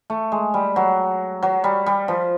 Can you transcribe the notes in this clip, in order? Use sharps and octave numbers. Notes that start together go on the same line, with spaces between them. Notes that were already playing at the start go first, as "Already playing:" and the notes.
A3
G#3
G3
F#3
F#3
G3
G3
F3